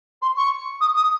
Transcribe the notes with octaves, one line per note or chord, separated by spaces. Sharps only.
C6
C#6
D#6
D#6